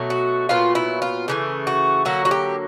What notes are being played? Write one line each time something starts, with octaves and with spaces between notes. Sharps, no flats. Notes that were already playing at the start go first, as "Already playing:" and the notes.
Already playing: B2 F#3 A3
F#4
A#2 F#3 B3 F4
E4
F4
C#3 E3 A3
F#4
D3 F#3 A#3 F#4
F#4
G4